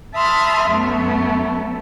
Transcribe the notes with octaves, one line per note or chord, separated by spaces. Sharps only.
E5 A5 B5 C6 D#6 F6
F#2 A3 B3